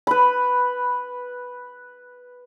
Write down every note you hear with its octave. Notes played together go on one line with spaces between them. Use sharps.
B4 B5